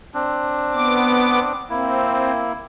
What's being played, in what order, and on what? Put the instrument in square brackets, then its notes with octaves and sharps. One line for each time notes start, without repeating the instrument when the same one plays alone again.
[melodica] C4 D4
[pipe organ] B3 D6
[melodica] A#3 E4 [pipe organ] C4